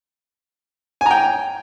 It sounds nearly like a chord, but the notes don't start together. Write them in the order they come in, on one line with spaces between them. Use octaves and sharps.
G#5 A#5 G5